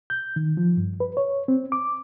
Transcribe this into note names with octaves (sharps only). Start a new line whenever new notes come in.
G6
D#3
F3
G2
B4
C#5
C4
D6